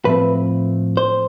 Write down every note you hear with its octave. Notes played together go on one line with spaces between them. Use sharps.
A2 F3 A3 C4 B4
C5